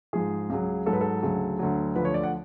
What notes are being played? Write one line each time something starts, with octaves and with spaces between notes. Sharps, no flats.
G#2 F3 G#4
C#2 C#3 F#3
G#2 F#3 A4
B4
A4
D2 C#3 F#3
D2 D3 F#3
D2 D3 F3 B4
C#5
D5
F#5